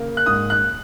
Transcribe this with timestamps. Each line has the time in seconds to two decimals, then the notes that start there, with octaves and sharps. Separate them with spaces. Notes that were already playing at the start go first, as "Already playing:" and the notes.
Already playing: C#3 A#3
0.17 F#6
0.26 G#2 D#6
0.50 F#6